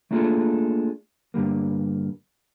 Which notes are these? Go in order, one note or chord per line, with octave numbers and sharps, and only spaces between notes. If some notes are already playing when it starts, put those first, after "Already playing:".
A3 A#3 D4 F4 G#4 A4
G2 D3 G3 A#3